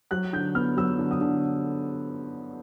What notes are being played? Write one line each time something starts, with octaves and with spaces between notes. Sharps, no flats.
F#3 F#6
D3 G6
B3 F6
F#3 E6
D3
D#6
D3